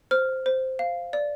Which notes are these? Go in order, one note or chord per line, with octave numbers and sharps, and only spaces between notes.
C5 F6
C5
F5
D5